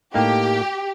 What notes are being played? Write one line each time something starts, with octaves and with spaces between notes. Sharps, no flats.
A2 A#3 D#4 G4